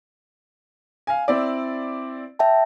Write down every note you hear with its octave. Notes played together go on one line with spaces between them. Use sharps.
F5 G#5
C4 E4 D5
E5 G5 A5